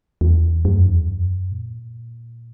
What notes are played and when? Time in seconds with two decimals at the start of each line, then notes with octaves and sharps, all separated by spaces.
0.21 E2
0.65 F#2
0.87 E2
1.09 F#2
1.52 A#2